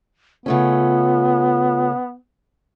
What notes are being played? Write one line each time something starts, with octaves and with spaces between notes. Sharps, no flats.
C#3 A3 B3 C#4 F4